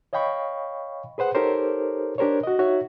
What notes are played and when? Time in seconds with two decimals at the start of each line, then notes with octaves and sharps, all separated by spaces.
0.13 C#5 D#5 F5 G5 B5 C#6
1.18 G#4 B4 C5 F#5
1.34 D#4 G4 A4 A#4 C5 C#5
2.18 D4 G4 A#4 C5 C#5
2.43 F#4 D#5
2.59 D#4 F#4 C#5 E5